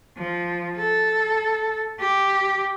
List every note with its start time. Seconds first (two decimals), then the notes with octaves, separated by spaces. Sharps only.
0.18 F3
0.78 A4
2.00 G4